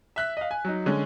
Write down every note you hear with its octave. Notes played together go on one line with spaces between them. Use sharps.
E5 F#6 B6
D#5 F5
G#5
F#3 D#4
D3 G#3 C#4